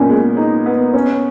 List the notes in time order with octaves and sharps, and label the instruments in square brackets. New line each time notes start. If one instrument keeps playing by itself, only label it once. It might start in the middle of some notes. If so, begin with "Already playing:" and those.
Already playing: [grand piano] A#2 B3 [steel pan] C#4
[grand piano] G#3
D#4
B3
C#4